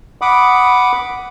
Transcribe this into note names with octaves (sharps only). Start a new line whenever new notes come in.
F#5 B5 D6 D#6